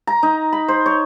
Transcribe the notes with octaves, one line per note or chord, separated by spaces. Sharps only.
A#5
D#4
B5
C5
C#5